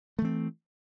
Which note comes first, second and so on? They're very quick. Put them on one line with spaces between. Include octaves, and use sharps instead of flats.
A3 E3 C4